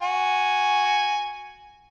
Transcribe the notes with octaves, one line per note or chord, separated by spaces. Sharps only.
F#4 G#5